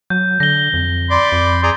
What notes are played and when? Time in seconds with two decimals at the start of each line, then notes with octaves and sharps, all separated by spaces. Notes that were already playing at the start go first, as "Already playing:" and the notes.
0.10 F#3 G6
0.40 D3 A#6 G7
0.74 F2
1.11 D5 B5 C6
1.32 F2
1.63 G#4 D5 A#5